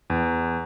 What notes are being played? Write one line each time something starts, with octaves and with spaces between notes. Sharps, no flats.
E2